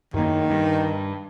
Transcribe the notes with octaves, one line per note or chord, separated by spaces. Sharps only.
F#2 D#3 A#3
G2